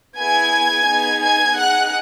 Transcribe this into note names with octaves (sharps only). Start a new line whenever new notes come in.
B3 E4 G#4 G#5 G#6
B3 D#4 G#4
G#5 G#6
D#4 G#4 F#5 F#6